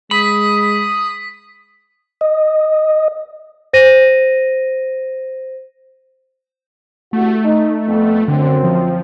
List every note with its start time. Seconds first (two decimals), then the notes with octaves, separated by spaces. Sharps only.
0.11 G#3 B5 D#6 B6
2.21 D#5
3.73 C5 A#6 D#7
7.13 C2 A3 F#4
7.44 D#4
7.87 F2 B3
8.28 F#2 D3 C4
8.64 F3